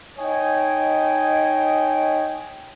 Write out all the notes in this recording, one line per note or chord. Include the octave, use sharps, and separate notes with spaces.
D#4 C#5 D#5 G5 G#5